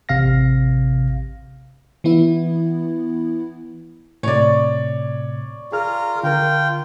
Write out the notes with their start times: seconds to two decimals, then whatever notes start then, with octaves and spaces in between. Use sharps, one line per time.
0.09 A1 C3 F5 A#6
2.04 E3 B3 E4
4.23 A2 C3 C#5 D5
5.72 F4 G#4 A#4 F6
6.23 D3 F4 A#4 G5